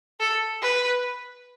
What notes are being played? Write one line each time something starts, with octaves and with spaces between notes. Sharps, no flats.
A4
B4